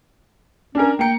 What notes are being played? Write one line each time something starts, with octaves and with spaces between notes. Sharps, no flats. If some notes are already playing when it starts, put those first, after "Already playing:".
C#4 D4 A#4
A#3 G5 A#5 C#7